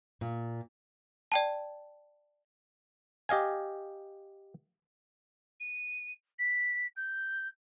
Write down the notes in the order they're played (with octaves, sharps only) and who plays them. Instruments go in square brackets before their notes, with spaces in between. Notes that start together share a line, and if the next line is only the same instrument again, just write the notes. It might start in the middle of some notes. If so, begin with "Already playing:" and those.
[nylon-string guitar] A#2
[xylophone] D5 G5 A5
[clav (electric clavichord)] G4 D#5 F5 G#5
[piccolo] D#7
B6
G6